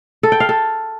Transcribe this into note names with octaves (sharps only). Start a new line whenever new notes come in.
A4
G5
F5
A4